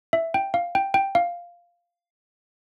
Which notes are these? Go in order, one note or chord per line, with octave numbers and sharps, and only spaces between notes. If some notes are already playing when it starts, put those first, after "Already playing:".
E5
G5
F5
G5
G5
F5